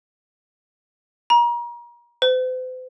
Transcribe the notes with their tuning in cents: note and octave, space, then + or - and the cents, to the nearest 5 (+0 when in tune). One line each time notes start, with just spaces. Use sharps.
A#5 +35
C5 -45